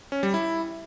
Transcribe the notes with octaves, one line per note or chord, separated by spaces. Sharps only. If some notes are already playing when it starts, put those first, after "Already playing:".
C#4
G3
E4